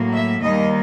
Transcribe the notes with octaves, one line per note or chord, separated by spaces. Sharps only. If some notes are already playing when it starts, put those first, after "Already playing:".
Already playing: A2 F#3 A#3
E5
D#2 D#3 G3 A#3 D#5